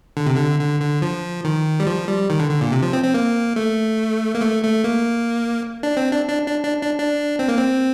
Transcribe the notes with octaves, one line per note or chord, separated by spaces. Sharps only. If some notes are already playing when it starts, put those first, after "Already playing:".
D3
C3
D3
D3
D3
F3
D#3
G3
F3
G3
D#3
D3
D3
A#2
C3
F3
C4
C4
A#3
A3
A#3
A3
A3
A#3
D4
C4
D4
D4
D4
D4
D4
D4
C4
A#3
C4